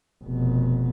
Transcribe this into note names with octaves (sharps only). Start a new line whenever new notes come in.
F1 B2